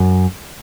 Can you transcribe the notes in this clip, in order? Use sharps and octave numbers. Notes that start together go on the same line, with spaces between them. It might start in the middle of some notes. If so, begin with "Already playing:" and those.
Already playing: F#2